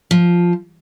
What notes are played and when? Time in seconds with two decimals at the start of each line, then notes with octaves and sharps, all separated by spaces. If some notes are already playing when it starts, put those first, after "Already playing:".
0.11 F3